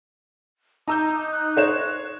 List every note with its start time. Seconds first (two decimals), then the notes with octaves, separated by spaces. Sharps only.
0.88 D#4 A#5 D6 E6 G6
1.32 F#6
1.57 C5 C#5 E7